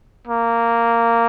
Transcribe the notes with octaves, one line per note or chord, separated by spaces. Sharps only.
A#3